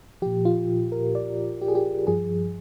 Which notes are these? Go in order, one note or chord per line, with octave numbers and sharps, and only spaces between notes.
A#2 F3 G4
F4
A#4
D5
G4
G#4
G4
G2 F3 G#4